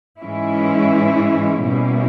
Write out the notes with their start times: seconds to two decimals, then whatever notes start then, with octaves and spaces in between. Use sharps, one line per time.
0.19 G#2 E3 G#3 C#4 E4
1.64 B2 G3 A#3 C#4 E4